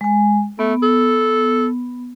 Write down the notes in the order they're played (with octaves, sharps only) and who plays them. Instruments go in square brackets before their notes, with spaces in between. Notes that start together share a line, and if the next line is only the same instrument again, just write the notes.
[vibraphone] G#3 G#5
[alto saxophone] A3 [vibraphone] B3
[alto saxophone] A4